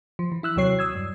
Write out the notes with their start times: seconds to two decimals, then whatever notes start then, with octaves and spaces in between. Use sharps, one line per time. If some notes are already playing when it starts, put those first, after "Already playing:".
0.19 F3
0.32 E3
0.43 E4 E6 F#6
0.56 D#2 C3 F#3 C#5 C7
0.79 D#6 E6 G#6
0.95 G2